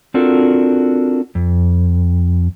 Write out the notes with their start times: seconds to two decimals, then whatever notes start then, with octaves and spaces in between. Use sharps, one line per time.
0.14 C4 D4 F4 F#4 A4 A#4
1.35 F2